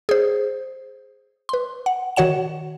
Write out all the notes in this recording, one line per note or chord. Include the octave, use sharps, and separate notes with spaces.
G#4 C5
B4 C6
F#5
D#3 F#4 C#5 F#5 E7